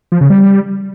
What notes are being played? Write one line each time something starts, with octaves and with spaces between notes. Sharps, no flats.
F3
C#3
G3